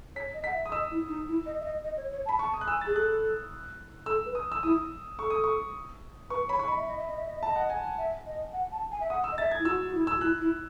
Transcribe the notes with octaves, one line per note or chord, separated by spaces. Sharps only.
C#5 B6
D#5
F#5 B6
E5
D#6
D#5 E6
E4
D#4
E4
D#5
E5
D#5
D#5
C#5
C#5
A5
B5
A5 C#6
D#6
F#6
G#5 E6
A6
G#4
A4 F#6
A4 E6
B4
D#6
E6
E4 D#6
A4 C#6
D#6
C#6
B4 C#6
C#5 B5
C#6
D#5 B5
E5
D#5
E5
D#5
E5
D#5
E5
A5
D#5
F#5
G#5
E5
D#5
F#5
A5
G#5
E5
F#5 D#6
E6
D#5
E5 A6
G#6
E4
F#4 E6
F#4
E4
E6
F#4
E4 F#6
E4